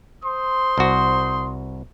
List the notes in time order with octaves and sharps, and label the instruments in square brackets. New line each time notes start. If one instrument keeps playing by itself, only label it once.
[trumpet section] C5 C6 D#6
[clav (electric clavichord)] C2 F#4